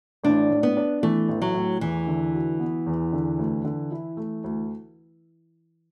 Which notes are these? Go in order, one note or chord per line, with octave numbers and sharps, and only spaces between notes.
A1 D4
A2
B3
D4
E3 A3
A1
F#3
A2
E2 E3
D3
F#4
B3
E2
D3
D2
D3
E4
A3
D2